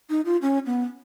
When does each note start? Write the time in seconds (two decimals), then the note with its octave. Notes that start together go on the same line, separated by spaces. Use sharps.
0.10 D#4
0.25 F4
0.42 C#4
0.66 B3